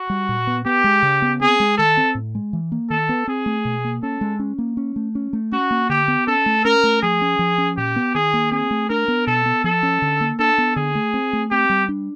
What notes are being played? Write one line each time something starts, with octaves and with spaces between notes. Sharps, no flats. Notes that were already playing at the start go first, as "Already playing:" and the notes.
Already playing: F#4
G3
A#2
B3
B3 G4
G#3
C#3
B3
C4 G#4
G#3
D#3 A4
C4
A2
G#3
E3
A#3
D#3 A4
B3
C4 G#4
A3
B2
A#3
C#4 A4
G#3
C#4
A#3
C#4
A3
C#4
A3
C#4 F#4
A#3
D3 G4
B3
C#4 A4
A3
C#4 A#4
A3
F3 G#4
C#4
F3
C#4
A#2 G4
B3
D#3 G#4
A#3
C4 G#4
A3
D4 A#4
B3
B2 A4
B3
F3 A4
C#4
D3
A#3
D4 A4
B3
D3 G#4
A3
C4
A3
C4 G4
G3
D4